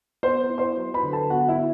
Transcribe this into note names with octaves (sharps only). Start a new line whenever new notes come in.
B3 C5 C6
E4
C5 C6
F#3
B4 B5
D3
A4 A5
B3 F#4 F#5
E4 E5
E4